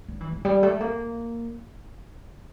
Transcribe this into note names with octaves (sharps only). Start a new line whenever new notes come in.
G3
E3
E3
G3
A3
A#3